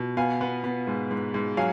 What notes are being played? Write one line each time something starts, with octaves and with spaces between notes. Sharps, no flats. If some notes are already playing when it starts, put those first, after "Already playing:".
Already playing: B2
B3 F5 G#5
B3
B3
G#2
G#2
G#2
F#3 F5 G#5